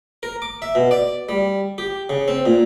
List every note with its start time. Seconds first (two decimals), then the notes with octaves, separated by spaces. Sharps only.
0.23 A#4
0.42 D6
0.62 E5
0.75 B2
0.91 D5
1.29 G3
1.78 G4
2.09 C#3
2.28 C4
2.46 A#2